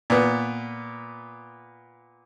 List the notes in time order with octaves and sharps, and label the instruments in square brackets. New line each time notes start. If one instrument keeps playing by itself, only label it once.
[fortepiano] A#2 B3